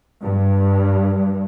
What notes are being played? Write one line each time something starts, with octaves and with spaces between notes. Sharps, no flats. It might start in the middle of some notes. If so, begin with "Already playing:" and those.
G2